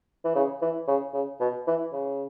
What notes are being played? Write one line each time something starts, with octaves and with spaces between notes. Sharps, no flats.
E3
C#3
E3
C#3
C#3
B2
E3
C#3